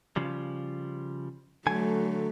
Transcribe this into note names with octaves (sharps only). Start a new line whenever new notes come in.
C#3 F3 G3
D3 F#3 A3 G#5